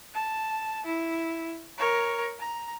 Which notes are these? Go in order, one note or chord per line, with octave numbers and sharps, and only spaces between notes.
A5
E4
A#4 C#5
A#5